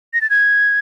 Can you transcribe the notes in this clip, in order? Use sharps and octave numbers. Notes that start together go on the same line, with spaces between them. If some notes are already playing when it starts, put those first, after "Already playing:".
A#6
A6
G#6